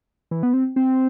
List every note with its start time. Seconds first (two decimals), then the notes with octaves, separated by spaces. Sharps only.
0.31 E3
0.43 B3
0.53 C4
0.76 C4